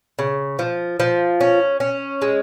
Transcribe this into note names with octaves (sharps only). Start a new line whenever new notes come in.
C#3
F3
F3
C#4
C#4
G#3